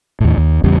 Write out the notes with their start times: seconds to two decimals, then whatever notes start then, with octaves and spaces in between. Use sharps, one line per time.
0.20 D#2 A2
0.38 D#2
0.64 A1 E2 C#3 G3